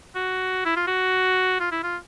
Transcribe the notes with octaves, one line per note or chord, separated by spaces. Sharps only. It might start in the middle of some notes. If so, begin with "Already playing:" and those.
F#4
E4
F4
F#4
F4
E4
F4